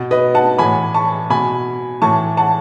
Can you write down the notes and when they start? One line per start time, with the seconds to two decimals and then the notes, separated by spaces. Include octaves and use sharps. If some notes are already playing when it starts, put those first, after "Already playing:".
Already playing: B2
0.11 B4 D#5
0.35 F#5 A5
0.58 A2 E3 G#5 B5
0.94 A5 C#6
1.30 B2 G#5 B5
2.02 A2 E3 A5 C#6
2.37 F#5 A5